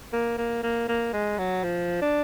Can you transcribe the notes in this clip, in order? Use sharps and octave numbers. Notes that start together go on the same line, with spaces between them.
A#3
A#3
A#3
A#3
G#3
F#3
F3
D4